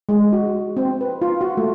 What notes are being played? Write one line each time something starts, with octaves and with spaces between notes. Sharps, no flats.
G#3
F#4
C4
B4
F4
F#4
A3